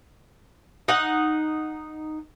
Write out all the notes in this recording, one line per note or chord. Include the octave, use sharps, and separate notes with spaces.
D#4 F#5